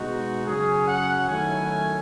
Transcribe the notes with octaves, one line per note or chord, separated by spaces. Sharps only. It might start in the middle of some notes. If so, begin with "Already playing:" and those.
Already playing: B2 G#3 D#4 F#4
F#2 C#3 F#3 C#4 G#4
F#5
D#3 F#3 A3 C#4 E4 G#5